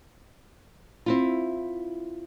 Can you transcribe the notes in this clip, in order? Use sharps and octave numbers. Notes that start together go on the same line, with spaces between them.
C4 E4 F4